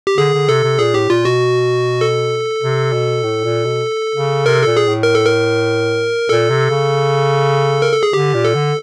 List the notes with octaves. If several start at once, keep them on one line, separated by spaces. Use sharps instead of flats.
G4
D3 G#4
D3
C3 A4
C3
A#2 G#4
A2 G4
A#2 F4
B2 F#4
A4
C3
B2
A2
A#2
B2
C#3
C3 A#4
A#2 A4
G#4
A2
A#4
A4
A#4
A#2 A4
C3
C#3
A#4
A4
G#4
D3 G4
A#2
A4
D3